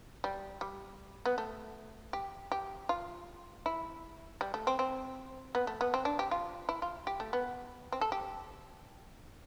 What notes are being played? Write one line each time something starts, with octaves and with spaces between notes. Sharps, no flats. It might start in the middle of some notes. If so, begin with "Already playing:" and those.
G3
G3
B3
A3
G4
G4
F4
E4
G3
A3
C4
C4
B3
A3
B3
C4
D4
G4
F4
E4
F4
G4
A3
B3
C4
A4
G4